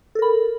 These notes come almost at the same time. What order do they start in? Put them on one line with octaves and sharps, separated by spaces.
A4 A#4 B5